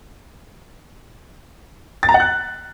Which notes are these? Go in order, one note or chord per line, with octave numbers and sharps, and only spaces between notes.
A6
A#5
F#5
F#6